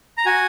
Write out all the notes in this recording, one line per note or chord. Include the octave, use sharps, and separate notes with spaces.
A#5
F#4 G#5